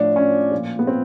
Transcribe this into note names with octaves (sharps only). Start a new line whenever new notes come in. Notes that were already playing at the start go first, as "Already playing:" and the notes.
Already playing: A2 F3 D4
C#4
A#2 F3
B3
C4